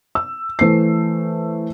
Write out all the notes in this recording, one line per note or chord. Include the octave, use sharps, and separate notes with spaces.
E6
E3 A3 C5 C7